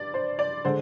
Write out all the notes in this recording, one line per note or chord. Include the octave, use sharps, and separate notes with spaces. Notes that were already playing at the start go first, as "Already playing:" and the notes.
Already playing: G2 D5
C5
D5
D3 G#3 C5